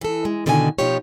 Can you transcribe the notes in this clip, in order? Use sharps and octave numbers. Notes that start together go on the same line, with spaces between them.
E3 A4
G#3
B2 D3 D#3 F#4 C5 G#5
B2 F3 D#4 F4 G4 C#5